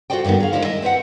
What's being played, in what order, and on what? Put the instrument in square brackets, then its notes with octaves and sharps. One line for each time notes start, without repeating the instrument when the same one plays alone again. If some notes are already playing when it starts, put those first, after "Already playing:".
[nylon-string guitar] F4 F#4 A4 C5 D5 G5
G2 D3 D#3 A#3 B3
G#4 F5
D3 D#3 G#3 C#4 E4 C5
D#5 E5
C4 B4 E5 F#5